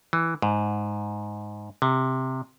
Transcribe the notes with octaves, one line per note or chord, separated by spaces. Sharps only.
E3
G#2
C3